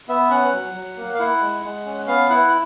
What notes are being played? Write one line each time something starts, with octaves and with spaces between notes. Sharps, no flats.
B3 E5
C#4 F#5
F#3
F#3
A#3
F5
E4 F#5
G#3
G#3
C#4
B3 F5
E4 F#5